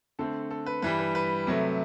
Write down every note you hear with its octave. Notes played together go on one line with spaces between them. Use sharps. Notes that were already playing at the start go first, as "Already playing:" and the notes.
D3 A3 C4 A4
A4
B4
G2 E3 G3 B4
B4
B4
C3 F#3 A3